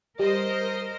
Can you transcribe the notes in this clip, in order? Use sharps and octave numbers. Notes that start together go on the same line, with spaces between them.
G3 A#4 C5 D#5